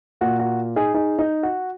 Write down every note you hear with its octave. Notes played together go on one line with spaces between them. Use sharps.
A#2 A#3 F#4
F#4
D#4 G#4
D#4 G#4
D#4
F#4